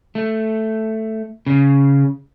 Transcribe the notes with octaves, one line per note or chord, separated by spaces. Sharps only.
A3
C#3